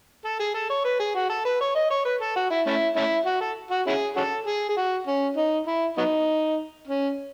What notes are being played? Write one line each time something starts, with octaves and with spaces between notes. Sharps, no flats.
A4
G#4
A4
C#5
B4
G#4
F#4
A4
B4
C#5
D#5
C#5
B4
A4
F#4
E4
A3 C#4 E4
A3 C#4 E4
F#4
A4
F#4
C#4 E4 G#4
C#4 F#4 A4
G#4
G#4
F#4
C#4
D#4
E4
F#3 B3 D#4
C#4